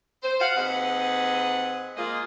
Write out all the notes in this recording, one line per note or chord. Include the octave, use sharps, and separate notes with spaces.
C5
F5 F#5
D#2 C4 G#4 B4 D#5 F#5
G#3 A#3 F4 G#4 D#5